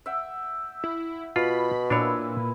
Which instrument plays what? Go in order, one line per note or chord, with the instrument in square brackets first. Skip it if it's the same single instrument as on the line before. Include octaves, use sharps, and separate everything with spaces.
[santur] E5 F#5 G5
[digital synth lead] E4
[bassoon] B2 [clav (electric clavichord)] F4 [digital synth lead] B5
[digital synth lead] A#2 [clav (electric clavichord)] D4 C#5 [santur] E4 B4 E6